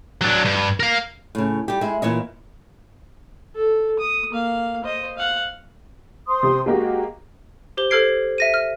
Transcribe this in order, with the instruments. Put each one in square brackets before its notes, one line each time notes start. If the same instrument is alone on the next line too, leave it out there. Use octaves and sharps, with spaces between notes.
[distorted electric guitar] F#3 D4
G2
A#4 F5
[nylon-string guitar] A2 C#3
G3 G4
G#3 E4
A#2 E3 C#5 D#5
[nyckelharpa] A4
D#6
A#3 F5
C5 D#5
F5 F#5
[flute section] C5 C6 D#6
[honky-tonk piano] C3 C4
[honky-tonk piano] G#3 A#3 G4 [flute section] F#4 D#5
[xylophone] G4 C5 G7
A4 C5 F6 G#6 C7 D7
E5 A#6 D#7
F6